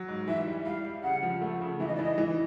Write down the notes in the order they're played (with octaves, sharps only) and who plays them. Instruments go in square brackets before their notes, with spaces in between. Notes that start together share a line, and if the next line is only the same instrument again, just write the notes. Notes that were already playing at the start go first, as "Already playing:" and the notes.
Already playing: [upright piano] F#3
G#2
[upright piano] E3 [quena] E5
[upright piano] G3
[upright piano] G3 [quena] F5
[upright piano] G3
[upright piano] C#3 [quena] F#5
[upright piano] F3
A3
C#3
[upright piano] E3 [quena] E5
[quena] D#5
D5
[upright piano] E3 [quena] D#5
[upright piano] E3